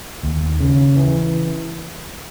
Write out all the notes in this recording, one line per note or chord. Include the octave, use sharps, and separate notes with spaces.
D#2
C#3
E3